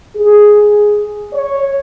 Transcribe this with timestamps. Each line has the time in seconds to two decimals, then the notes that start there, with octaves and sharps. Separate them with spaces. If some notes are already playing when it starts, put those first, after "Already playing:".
0.16 G#4
1.33 C#5